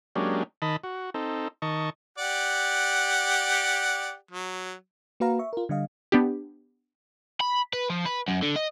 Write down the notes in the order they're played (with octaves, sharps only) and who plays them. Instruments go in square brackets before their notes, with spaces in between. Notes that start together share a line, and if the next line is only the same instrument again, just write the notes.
[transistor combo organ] F#3 G#3 A#3 C#4 D4 G4
D#3 D#5 A5 B5
F#4
C4 D#4 A4
D#3 D#5 A5 C#6
[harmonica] G4 D5 F#5
F#3
[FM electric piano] A#3 F#4 B4 F5 A#5
E5 C#6
F4 A#4
D3 G3 D#5 F5
[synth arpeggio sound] B3 D4 G4
[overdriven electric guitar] B5
B4
F3
B4
F#2
D3
D#5